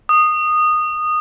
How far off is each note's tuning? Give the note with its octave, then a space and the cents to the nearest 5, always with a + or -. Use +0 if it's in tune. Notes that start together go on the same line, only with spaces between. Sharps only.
D#6 -15